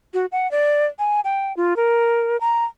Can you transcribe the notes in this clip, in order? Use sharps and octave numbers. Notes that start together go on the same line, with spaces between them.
F#4
F#5
D5
G#5
G5
F4
A#4
A#5